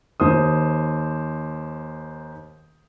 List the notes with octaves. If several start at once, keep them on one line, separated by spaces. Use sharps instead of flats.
D#2 C5 D#6